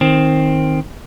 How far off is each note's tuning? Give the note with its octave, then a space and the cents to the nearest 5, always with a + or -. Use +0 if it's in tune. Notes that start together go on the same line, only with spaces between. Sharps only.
D#3 +0 C4 +10